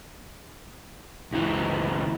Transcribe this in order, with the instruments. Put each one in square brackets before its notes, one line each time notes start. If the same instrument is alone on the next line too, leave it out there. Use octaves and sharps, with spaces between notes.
[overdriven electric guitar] C#2 E3